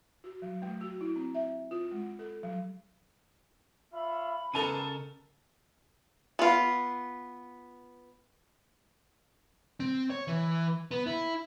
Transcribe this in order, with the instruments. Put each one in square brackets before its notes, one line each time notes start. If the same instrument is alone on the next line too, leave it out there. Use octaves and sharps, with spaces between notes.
[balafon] F#4
F#3
A3
F#4
E4
C4
E5
F4
G#3
A4
F#3
[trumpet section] F4 C#5 E5 [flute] B5
[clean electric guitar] C#3 A#4 [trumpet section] G#3 A#3 B3 [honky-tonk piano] A4 A5 D#7
[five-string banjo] B3 F4
[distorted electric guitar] C4
C#5
E3
B3
E4